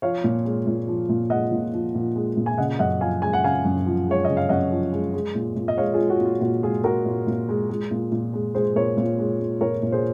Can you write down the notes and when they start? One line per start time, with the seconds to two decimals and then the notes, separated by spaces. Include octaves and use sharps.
0.02 F3 C#5 F5
0.24 A#2
0.45 G#3
0.67 A#2
0.88 F3
1.09 A#2
1.30 G#3 D#5 F#5
1.52 A#2
1.73 F3
1.95 A#2
2.16 G#3
2.37 A#2
2.46 G#5
2.58 C#3 D#5 F#5
2.79 F#2 D#5 F#5
3.01 F3 F5 G#5
3.22 G#3 G#5
3.33 F#5
3.44 C#3 F5 G#5
3.65 F#2
3.86 F3
4.07 G#3 C#5
4.25 C#3 D#5
4.37 F5
4.49 F#2 D#5 F#5
4.71 F3
4.93 G#3
5.14 G#3
5.35 A#2
5.56 A#2
5.68 D#5
5.77 G#3 C#5 F5
5.94 F4 G#4
5.99 G#3
6.10 F#4
6.20 A#2
6.25 F4
6.41 A#2 F#4
6.63 G#3 F4 G#4
6.84 G#3 F#4 A#4
7.05 A#2
7.27 A#2
7.49 G#3
7.69 G#3
7.91 A#2
8.12 A#2
8.33 G#3
8.55 G#3 G#4 C5
8.75 A#2 A#4 C#5
8.97 A#2
9.19 G#3
9.40 G#3
9.61 A#2 A#4 C#5
9.82 A#2
9.92 G#4 C5